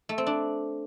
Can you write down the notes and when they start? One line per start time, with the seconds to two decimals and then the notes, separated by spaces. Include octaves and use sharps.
0.09 A3
0.18 C4
0.26 D4